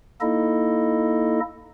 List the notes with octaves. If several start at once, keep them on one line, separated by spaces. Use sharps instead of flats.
A#3 D#4 E4 A4 D#5